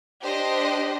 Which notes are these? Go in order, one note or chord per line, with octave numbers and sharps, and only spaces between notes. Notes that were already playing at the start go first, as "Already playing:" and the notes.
D4 G4 C5 D#5